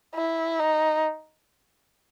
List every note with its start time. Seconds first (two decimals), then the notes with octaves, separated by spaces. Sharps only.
0.15 E4
0.59 D#4